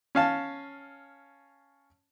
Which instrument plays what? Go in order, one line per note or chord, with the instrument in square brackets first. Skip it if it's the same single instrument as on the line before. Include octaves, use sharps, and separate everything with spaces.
[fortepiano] C#4 F5 A5